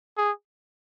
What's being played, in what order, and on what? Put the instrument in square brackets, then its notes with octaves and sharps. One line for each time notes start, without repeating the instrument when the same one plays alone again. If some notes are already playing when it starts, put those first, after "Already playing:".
[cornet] G#4